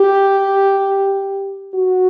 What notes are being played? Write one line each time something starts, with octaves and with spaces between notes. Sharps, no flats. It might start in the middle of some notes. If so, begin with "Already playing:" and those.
Already playing: G4
F#4